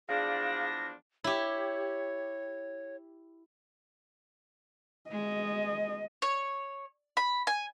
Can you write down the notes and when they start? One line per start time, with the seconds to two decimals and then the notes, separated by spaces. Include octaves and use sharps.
0.09 E2 F3 D4 G#4 F5 A#6
1.24 E4 G4 C#5
5.10 G#3 D#5
6.22 C#5
7.17 B5
7.47 G#5